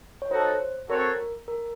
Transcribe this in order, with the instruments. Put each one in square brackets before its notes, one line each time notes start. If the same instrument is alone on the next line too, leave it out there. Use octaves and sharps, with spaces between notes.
[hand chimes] C#5
[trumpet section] D#4 F#4 A4 [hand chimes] C5
[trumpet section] C4 F#4 A4 C#5 [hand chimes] A#4
[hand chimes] A#4